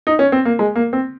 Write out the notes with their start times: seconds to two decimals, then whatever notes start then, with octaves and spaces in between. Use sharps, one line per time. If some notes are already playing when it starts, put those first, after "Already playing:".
0.07 D#4
0.19 C#4
0.32 C4
0.45 A#3
0.59 G#3
0.75 A#3
0.93 C4